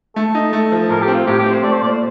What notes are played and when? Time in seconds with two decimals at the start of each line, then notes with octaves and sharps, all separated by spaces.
0.16 A3 A4
0.35 D#4
0.53 A3
0.72 F3
0.89 A2 A#4
1.02 G4
1.08 C4
1.14 F4
1.27 A2 G4
1.39 G4
1.45 C4
1.51 C5
1.63 A3 D5
1.73 C5
1.81 A#2 D5
1.92 C5